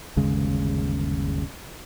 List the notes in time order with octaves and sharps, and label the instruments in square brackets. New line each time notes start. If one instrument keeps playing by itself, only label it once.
[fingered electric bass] G1 D#2 C#3 G#3